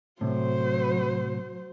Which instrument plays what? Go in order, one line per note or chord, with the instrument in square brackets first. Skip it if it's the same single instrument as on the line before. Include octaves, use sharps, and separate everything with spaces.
[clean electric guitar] A2 C3 [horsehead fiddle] F#3 C5